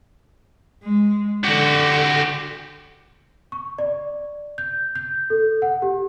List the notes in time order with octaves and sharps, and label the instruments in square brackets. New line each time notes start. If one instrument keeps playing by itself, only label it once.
[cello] G#3
[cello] D3 [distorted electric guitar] F#4 G4
[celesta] C#6
D5
G6
G6
A4
F#5
G4